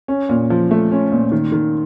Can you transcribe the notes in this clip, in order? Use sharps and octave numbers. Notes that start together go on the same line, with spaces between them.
C#4
A#2
F3
A3
C#4
A#2
D#3
D#3